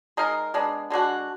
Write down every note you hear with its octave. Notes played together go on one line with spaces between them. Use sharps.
G#3 D#4 A#4
G#3 B3 D4
D3 G#3 D4 F#4